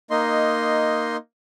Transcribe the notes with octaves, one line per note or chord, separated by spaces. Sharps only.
A#3 D#4 D#5 C6